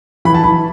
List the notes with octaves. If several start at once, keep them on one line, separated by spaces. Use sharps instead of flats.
E3 B5
A5
E3 B5